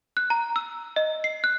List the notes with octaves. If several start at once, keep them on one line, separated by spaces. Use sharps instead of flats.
F#6
A#5
E6
D#5
C7
F#6